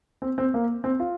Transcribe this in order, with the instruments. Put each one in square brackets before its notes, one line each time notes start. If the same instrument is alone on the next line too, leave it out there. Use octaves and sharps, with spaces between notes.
[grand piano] C4
C4
A#3
C4
F4